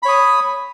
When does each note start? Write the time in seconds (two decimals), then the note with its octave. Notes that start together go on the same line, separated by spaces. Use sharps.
0.03 B5
0.05 C#5
0.08 D#6